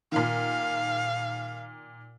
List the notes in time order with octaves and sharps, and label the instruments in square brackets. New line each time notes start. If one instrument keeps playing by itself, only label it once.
[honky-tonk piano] A#2 D#3 [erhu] F5